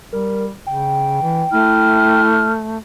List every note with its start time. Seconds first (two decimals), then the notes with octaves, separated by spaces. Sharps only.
0.13 G3 A#4
0.67 C#3 G5
1.22 E3
1.52 A3 E4 F6